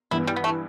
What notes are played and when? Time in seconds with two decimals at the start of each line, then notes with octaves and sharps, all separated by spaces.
0.11 G2 E3 B3 E4
0.27 G3
0.36 B3
0.44 A3